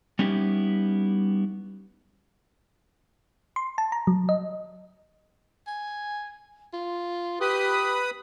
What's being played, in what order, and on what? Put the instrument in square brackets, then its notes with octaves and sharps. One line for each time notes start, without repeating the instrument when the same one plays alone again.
[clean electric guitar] G3 B3 C#4 D#4 E4 G4
[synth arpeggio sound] C6
A5
A#5
F#3
D#5
[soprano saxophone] G#5
F4
[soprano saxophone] G4 [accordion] B4 B5 D#6